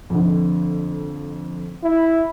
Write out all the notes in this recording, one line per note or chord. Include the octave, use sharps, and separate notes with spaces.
F2 D3
E4